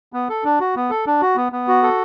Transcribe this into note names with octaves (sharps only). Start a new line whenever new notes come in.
B3
A4
D4
F#4
B3
A4
D4
F#4
B3
B3
F#4
A4